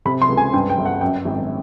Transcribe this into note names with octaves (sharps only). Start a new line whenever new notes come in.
C3 B5
C6
C#2
G#5
G2 G5
G5
G1
F#5
F#2 G5
G#1